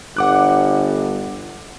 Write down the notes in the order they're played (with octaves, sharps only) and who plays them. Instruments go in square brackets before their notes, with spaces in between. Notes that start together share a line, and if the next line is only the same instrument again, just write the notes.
[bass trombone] G1 [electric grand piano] F#5 D6 F#6